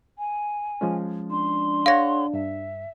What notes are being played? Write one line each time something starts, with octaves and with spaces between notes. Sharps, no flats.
G#5
F3 G#3 C#4
D4 C6
G#4 C#5 F5 F#5 A#6
G2 E5